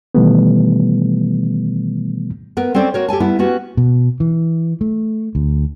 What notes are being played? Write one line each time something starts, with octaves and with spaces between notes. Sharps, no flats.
B2 D#3 E3 G3 A3 B3
B3 A#4
C4 C#4 A4 C5 D5
F#4 A#4 C#5
G4 A4 G#5 A5
G3 B3 E4
B3 C#4 F#4 G4
B2
E3
A3
D2